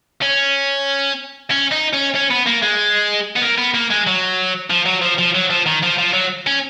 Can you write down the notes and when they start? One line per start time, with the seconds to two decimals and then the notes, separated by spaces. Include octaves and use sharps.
0.22 C#4
1.51 C#4
1.72 D#4
1.93 C#4
2.15 C#4
2.30 B3
2.46 A#3
2.62 G#3
3.36 B3
3.42 A#3
3.58 B3
3.75 A#3
3.90 G#3
4.07 F#3
4.70 F3
4.86 F#3
5.02 F3
5.19 F3
5.34 F#3
5.50 F3
5.66 D#3
5.83 F3
5.98 F3
6.13 F#3
6.47 C#4